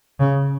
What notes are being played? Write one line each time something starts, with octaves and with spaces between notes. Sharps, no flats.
C#3